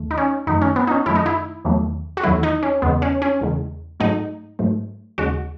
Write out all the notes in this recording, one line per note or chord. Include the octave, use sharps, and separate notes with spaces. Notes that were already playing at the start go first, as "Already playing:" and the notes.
Already playing: D#2 D#3 A3
D#4
C#4
F#2 D#3 A3 D#4
C#4
B3
D#4
C#4
F#2 D#3 A3 E4
D#4
E4
E2 D#3 F#3 A3
F#4
E2 D#3 F#3 A3 E4
D#4
C#4
E2 C#3 G#3 B3
C#4
C#4
E2 C#3 G#3
G#2 F#3 A3 D#4
G#2 F#3 A3
D#2 C#3 G#3 F#4